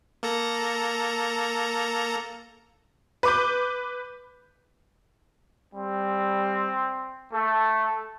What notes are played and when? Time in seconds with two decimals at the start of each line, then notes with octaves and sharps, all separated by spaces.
0.23 A#3 A4 A#5
3.23 B4 D6 G6
5.74 G3 C4
7.33 A3 A4